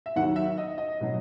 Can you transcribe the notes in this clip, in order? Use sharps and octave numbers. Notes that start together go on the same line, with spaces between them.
E5
D#2 D#3 F#3 F#5
E5
D#5
D#5
B2 F#3